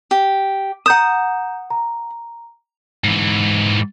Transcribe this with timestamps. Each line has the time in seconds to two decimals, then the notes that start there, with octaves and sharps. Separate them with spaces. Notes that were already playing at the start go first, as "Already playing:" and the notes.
0.11 G4
0.86 F#5 A#5 D#6 G6 E7
1.70 A#5
3.04 G#2 E3